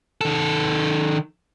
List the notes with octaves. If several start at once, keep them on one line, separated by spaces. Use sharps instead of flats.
D#3 A4